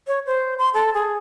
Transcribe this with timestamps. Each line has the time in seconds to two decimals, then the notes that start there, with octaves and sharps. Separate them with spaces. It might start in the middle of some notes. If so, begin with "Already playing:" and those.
0.07 C#5
0.26 C5
0.58 C6
0.74 A4
0.94 G#4